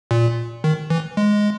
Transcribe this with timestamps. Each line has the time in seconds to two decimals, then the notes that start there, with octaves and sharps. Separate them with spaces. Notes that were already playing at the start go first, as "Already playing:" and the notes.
0.11 A#2
0.64 D#3
0.90 E3
1.17 G#3